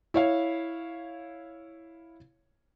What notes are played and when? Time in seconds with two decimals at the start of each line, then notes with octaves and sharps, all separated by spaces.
0.14 E4 C#5 F5